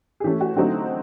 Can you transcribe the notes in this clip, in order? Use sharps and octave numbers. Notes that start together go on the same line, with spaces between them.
G#4
E3 A3 C#4 G4
F#4
D3 F#3 A3 C4 D#4 F#4